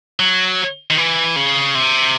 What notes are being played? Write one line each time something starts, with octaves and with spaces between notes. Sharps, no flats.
F#3
D#3
E3
C#3
C3